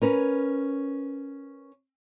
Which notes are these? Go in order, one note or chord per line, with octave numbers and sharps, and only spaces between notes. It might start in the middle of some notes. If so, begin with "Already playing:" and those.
C#4 A#4 B4 C#5